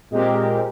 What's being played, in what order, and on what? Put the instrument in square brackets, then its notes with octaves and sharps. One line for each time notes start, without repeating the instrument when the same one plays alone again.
[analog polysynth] A#2 G#3 C4 G4 A#4